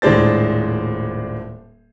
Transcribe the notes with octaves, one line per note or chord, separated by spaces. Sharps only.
D#1 A2 G#3 D4 C5 A6